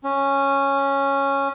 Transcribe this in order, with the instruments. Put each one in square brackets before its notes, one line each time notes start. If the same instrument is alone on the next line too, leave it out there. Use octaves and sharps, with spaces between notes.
[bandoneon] C#4